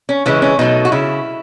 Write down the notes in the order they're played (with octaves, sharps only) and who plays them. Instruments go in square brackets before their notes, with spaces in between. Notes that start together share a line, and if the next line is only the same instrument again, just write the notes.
[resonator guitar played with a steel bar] C#4
C#3 E3 G#3 C#4
C#4
B2 F#3 A3 D#4
F#4
C#3 E4